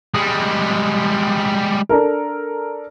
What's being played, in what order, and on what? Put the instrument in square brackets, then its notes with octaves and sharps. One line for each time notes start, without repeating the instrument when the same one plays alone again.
[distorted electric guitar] G3 G#3
[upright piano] D4 A4 A#4